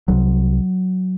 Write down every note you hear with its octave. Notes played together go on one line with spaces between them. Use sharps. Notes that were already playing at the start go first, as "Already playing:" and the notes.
C2 C3 F#3